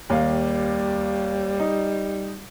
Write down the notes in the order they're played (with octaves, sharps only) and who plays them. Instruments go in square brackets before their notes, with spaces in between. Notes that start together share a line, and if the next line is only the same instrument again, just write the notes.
[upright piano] D#2 F5 [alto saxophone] G3
[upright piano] D#4